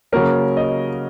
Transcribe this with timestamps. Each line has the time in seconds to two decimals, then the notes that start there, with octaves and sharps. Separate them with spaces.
0.12 C#3 F#3 A#3 C#4 A#4
0.57 D#5